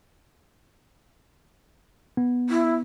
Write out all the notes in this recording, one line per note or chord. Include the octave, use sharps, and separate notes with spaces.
B3
E4